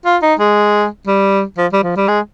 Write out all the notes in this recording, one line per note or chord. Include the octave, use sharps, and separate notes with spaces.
F4
D#4
G#3
G3
F3
G3
F3
G3
G#3